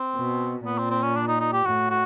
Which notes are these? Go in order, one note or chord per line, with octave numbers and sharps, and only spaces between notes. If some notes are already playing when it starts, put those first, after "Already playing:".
Already playing: C4
B2
A#2 B3
C4
C4
C#4
D4
D#4
D#4
G4
A2 F#4
F#4